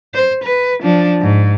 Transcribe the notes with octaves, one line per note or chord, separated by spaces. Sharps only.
C5
B4
F3 D4
G#2